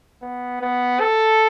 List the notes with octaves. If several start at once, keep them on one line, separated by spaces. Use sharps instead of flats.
B3
B3
A4